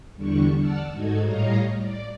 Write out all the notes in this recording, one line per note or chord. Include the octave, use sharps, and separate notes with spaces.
E2 D3 G3 D4 C#6
D5 F#5 A5 E6 F6
G#2 D#4 F#4 A4 G#6
A2 G3 C#5 D#5 F5 A#5
D5